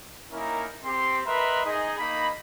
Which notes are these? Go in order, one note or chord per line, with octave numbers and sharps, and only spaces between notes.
A#3 C#4 D#4 E4 A#4
C4 G4 C6
A#4 B4 D#5 E5 B5 C6
D#4 G#4 D#5
A#3 D#4 D#5 B5